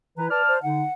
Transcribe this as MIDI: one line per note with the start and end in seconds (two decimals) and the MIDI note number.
0.18 0.28 52
0.18 0.28 64
0.18 0.28 71
0.18 0.29 82
0.30 0.42 71
0.30 0.56 74
0.30 0.56 81
0.30 0.56 89
0.48 0.61 72
0.62 0.83 50
0.62 0.83 63
0.62 0.94 78